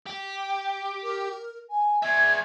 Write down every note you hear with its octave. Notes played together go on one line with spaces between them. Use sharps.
G4
A#4
G#5
G#4 E5 G#6